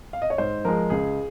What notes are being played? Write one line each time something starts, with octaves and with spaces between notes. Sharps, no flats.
F5
D#5
C#5
G#2 C5
F3 G#3 A#4
C#2 G#4